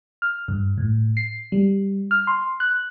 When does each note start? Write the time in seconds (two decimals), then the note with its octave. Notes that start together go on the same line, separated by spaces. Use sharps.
0.22 F6
0.48 G2
0.78 A2
1.17 C7
1.52 G3
2.11 F6
2.27 C6
2.60 F#6